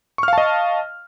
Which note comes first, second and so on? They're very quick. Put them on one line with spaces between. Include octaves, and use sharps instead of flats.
C#6 F6 F5 A5 D#5